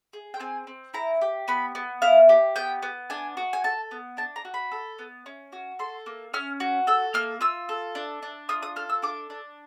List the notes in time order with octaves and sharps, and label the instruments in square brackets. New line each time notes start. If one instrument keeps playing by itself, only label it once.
[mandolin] G#4
G5
C4 G#5
C4
E4 A#5
G4
B3 B5
B3
E4 F5
G4
B3 G5
B3
D4 G#5
F#4
G#5
A4 A5
B3
D4 A5
A#5
F#4
B5
A4
B3
C#4
F#4
A4 C6
A#3
C#4 F6
F#4
A4 E6
A#3 F6
F4 E6
A4
D4
D4
F4 D#6
D#6
A4 F6
E6
D4 D6
D4